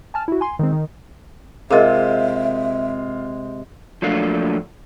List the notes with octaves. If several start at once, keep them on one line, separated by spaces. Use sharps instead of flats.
G#5 A5 F6
E4 F#4
G#5 C6
D#3 G#3 C4
D#3
C3 G#3 F4 G#4 A#4 D#5 E5
F3 F#3 A3 A#3 D4 F4